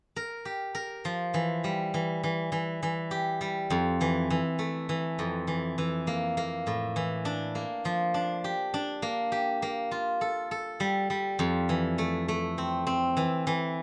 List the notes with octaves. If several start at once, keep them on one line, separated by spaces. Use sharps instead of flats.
A#4
G4
A#4
F3
E3
G3
E3
E3
E3
E3
G4
G3
F2
E3
E3
A3
E3
F2
E3
E3
A#3
A#3
A2
E3
D4
A#3
F3
D4
G4
D4
A#3
G4
A#3
F4
A4
A4
G3
G3
F2
E3
A3
A3
C4
C4
E3
E3